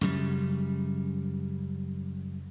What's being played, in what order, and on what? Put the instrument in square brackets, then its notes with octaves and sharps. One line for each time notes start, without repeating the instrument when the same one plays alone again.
[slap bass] F#2 C#3 G3